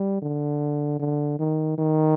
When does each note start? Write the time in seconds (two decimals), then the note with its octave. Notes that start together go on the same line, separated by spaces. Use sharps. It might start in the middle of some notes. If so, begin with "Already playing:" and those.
Already playing: G3
0.22 D3
0.99 D3
1.39 D#3
1.78 D#3